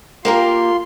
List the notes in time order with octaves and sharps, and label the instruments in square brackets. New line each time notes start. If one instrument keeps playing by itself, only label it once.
[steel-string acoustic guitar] A#3 G4 A#4 [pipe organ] F4 C6